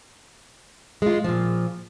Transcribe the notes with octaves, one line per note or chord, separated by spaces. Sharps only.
G#3 F4
A#2 F3